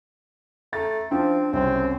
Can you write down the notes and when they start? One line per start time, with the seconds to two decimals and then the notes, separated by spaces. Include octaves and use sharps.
0.73 A3 A#5 A6
1.11 F3 C4 D4
1.53 C2 F#2 C#3 C4